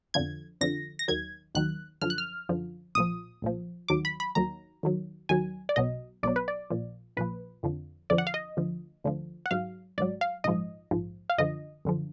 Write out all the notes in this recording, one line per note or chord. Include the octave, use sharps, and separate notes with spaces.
F2 D3 F3 G#6
F2 D3 F3 A#6
A#6
D#2 D#3 F#3 G#6
D#2 D#3 F#3 F#6
F#2 D3 F3 F6
F#6
F6
F#2 D3 F3
B1 A#2 F3 D#6
B1 A#2 F3
D#2 D#3 F#3 D6
B5
B5
D#2 D#3 F#3 A#5
D#2 D#3 F#3
D#2 D#3 F#3 G#5
D5
B1 B2 F#3 D#5
B1 B2 F#3 D5
B4
D5
A#1 A#2 F3
A#1 A#2 F3 B4
F2 D3 F3
F2 D3 F3 D5
F#5
F5
D#5
D2 D3 F3
D2 D3 F3
F#5
G#1 G#2 F#3 F5
G#1 G#2 F#3 D5
F5
A#1 G#2 F3 D#5
A#1 G#2 F3
F5
F#2 D3 F3 D#5
F#2 D3 F3